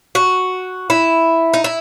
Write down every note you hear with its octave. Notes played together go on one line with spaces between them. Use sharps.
F#4
E4
D#4
E4